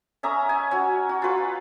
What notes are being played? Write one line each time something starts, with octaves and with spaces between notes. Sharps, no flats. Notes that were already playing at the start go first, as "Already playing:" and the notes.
C#4 E5 A#5 D#6
G#5
C#4 F#4
F#4
F4 B4